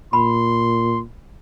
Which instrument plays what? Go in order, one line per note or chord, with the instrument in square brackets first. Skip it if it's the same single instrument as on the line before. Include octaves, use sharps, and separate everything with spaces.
[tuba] A#2 [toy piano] B5 [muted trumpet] C6